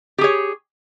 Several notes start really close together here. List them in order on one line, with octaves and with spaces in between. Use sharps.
G4 G#4 C#5